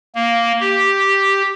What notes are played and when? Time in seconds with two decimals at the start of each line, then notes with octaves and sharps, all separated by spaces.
0.15 A#3
0.60 G4